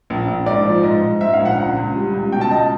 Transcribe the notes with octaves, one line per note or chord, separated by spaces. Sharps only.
A#1
A#1
G#2 D5
F3
G#2 D#5
G#2
G#2 E5
F5
A#1
F#5
C#2 F#5
C#2
G3
C#2
B2 G5
A5
C#2 D#5